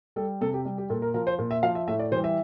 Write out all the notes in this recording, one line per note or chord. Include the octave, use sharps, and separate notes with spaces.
G3 A4
C3 A4
G4
G3
G4
A#2 A4
A#4
F3 A#4
C5
A#2
E5
F3 F5
E5
A2 E5
D5
E3 G3 C5
E5